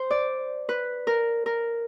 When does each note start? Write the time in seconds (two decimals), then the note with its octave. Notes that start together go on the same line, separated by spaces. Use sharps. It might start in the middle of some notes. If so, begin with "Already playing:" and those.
Already playing: C5
0.11 D5
0.69 B4
1.07 A#4
1.46 A#4